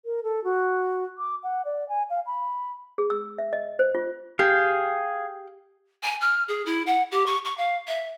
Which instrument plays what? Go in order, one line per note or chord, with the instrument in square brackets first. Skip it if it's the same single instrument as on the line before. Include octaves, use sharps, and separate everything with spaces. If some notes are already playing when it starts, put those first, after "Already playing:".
[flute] A#4
A4
F#4
D6
F#5
D5
G#5
F5
B5
[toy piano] G#4
E6
E5
D#5
C5
F4
[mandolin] G4 [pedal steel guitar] G#4 F5
[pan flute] G#5
F6
G#4
E4
F#5
G4
C#6
C#6
F5
E5